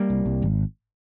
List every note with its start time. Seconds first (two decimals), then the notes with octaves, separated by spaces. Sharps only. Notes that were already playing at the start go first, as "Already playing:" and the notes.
Already playing: G3 A#3
0.10 C2
0.26 C2
0.42 G#1